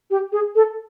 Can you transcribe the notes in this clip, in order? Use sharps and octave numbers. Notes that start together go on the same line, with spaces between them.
G4
G#4
A4